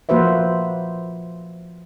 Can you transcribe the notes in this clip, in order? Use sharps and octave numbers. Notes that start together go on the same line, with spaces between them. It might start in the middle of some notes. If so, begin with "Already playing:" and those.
F3 A#3 F#4 B4 C5 E5